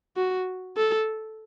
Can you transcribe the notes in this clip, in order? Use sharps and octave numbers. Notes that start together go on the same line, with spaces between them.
F#4
A4